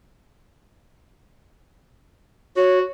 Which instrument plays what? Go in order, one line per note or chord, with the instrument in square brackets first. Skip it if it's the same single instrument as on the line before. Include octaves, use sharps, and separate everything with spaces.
[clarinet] F#4 [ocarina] C#5